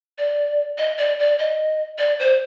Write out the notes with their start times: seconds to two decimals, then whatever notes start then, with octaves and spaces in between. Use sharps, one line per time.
0.18 D5
0.78 D#5
0.98 D5
1.19 D5
1.39 D#5
1.98 D5
2.19 C5